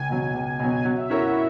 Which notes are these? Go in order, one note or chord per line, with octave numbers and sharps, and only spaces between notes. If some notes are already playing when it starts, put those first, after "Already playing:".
Already playing: C#2 G#5
B2 F#3
C#2
B2 F#3
G#5
F#3 F#5
E5
C#4 E4 F#4 A#4 C#5
E4